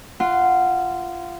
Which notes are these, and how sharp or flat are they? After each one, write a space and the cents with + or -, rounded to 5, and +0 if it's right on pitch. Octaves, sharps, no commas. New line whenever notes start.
F4 -15 F#5 +0